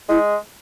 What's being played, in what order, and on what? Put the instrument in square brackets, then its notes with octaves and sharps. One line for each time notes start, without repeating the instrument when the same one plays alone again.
[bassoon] G#3 [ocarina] E4